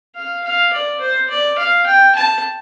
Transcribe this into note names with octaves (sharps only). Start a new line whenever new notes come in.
F5
F5
D5
C5
D5
F5
G5
A5